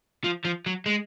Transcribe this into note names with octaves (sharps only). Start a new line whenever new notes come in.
F3
F3
F#3
G#3